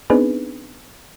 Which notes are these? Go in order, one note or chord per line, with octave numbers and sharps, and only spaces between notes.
B3 C4 D4 D#4 G#4 B4